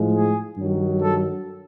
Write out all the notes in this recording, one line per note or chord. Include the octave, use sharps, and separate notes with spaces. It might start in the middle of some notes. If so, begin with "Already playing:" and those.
Already playing: A2 F3 G#3
G#4
G2 D#3 F#3
A4